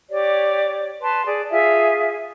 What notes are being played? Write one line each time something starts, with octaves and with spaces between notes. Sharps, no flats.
G4 C#5 D5
B4 A5 C6
G#4 D5
F4 G#4 E5